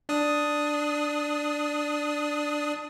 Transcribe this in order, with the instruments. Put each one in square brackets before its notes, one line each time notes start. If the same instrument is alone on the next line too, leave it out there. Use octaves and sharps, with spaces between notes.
[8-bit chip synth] D4 D#6